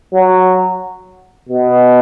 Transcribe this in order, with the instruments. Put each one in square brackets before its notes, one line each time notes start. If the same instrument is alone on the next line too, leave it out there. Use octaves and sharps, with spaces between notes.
[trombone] F#3
B2